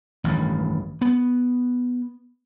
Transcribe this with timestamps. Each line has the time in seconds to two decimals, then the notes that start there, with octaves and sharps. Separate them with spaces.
0.24 A1 G2 D#3
1.01 B3